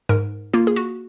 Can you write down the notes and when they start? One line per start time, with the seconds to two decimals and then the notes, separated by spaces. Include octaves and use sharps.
0.09 G#2 A#4
0.54 A#3 F4
0.67 G#4
0.76 F#4